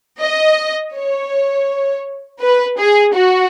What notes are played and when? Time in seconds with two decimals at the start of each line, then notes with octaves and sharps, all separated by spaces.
0.21 D#5
0.94 C#5
2.41 B4
2.78 G#4
3.14 F#4